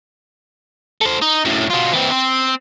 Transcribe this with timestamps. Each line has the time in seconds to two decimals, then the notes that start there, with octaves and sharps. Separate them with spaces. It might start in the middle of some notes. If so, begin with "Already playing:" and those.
1.01 A3 C5
1.21 D#4
1.45 F#2 A2
1.70 B2 F4
1.92 E3 C4
2.11 C4